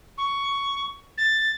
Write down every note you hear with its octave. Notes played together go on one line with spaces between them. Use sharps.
C#6
A6